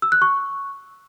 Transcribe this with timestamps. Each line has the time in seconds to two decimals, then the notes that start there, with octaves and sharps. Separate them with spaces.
0.02 E6
0.12 F#6
0.22 C#6